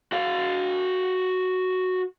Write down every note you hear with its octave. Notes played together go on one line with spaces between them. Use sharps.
F#4 F5